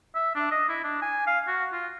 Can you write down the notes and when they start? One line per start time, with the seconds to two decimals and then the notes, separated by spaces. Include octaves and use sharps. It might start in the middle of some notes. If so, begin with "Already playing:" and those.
0.15 E5
0.35 D4
0.51 D#5
0.69 E4
0.84 D4
1.02 G#5
1.27 F5
1.47 F#4
1.72 F4